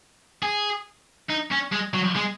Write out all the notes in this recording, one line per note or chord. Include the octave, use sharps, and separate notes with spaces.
G#4
D#4
C#4
G#3
F#3
G#3